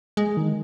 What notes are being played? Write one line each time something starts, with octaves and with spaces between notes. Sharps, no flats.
G#3
D#3